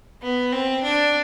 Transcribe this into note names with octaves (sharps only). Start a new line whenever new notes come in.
B3
C4
D4